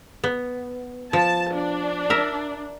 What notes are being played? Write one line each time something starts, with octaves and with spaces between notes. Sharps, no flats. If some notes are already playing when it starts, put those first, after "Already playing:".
B3
F3 A5
D4
A#4 E5